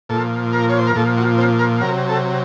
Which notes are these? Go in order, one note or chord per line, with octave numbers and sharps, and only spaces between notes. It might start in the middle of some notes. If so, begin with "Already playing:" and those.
A#2 F3 A4
A#4
C#5
C5
A#4
A#2 F3 A4
F#4
C4
A#4
C3 F#3 A#4
A4